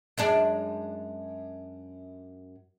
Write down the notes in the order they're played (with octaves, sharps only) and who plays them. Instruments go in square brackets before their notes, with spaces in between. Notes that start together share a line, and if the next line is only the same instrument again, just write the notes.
[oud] F#2 G#3 D4